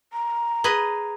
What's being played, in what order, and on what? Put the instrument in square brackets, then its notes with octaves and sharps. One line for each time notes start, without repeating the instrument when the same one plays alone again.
[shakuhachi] A#5
[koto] G#4 B4 D#5